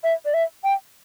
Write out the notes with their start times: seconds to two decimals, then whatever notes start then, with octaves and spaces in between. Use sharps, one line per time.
0.03 E5
0.25 D5
0.34 E5
0.64 G5